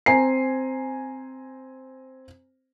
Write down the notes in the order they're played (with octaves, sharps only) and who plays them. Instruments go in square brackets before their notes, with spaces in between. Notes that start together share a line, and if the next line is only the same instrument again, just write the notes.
[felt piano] C4 C5 G#5 A#5 C7